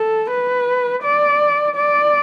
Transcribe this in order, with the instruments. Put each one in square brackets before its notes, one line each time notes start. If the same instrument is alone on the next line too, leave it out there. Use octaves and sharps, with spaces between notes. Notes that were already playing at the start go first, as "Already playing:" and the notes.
Already playing: [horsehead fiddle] A4
B4
D5
D5